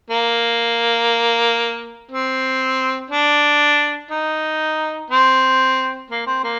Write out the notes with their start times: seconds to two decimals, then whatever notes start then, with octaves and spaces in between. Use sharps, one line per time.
0.10 A#3
2.11 C4
3.10 D4
4.11 D#4
5.10 C4
6.11 A#3
6.26 C4
6.44 A#3